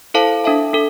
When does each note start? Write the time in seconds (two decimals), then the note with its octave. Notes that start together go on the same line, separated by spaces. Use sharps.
0.14 E4 A4 C5 F5 A5
0.44 D4 A4 E5 A5
0.73 D4 A4